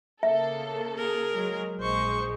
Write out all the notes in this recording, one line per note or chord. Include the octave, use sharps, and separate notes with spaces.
C#3 A#3 A4 E5
G#4 A#4
F#3 G#3
A#1 G#3 C5 C#6